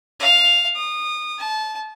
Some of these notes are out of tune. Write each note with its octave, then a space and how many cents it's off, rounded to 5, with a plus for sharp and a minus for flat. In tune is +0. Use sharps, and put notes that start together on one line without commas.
F5 +5
D#6 -25
A5 -25